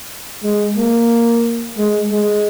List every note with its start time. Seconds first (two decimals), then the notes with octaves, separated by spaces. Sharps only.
0.43 G#3
0.76 A#3
1.77 G#3
2.10 G#3